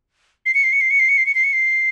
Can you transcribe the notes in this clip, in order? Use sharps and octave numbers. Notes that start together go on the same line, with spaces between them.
C7
C#7
C7
C#7
C7
C#7
C7
C#7
C7
C#7
C7
C#7
C7